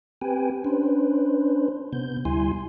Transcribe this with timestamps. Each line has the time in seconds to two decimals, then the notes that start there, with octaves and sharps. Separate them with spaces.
0.21 C4 G4 B4 G5 G#5
0.65 C#4 D4 B4 C5
1.93 C3 B3 G6
2.25 D2 G3 E4 G#5 C6